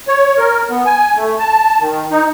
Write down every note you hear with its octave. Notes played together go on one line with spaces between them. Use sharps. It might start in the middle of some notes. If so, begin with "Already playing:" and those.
C#5
A#4
B3
G#5
A3
A5
D#3
D#4